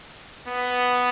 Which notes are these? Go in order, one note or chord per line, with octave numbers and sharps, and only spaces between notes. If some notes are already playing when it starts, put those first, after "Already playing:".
B3